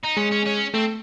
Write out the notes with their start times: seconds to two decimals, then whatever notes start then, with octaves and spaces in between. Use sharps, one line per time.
0.03 D#4
0.17 G#3 C#4
0.31 C#4
0.46 C#4
0.74 A3 C4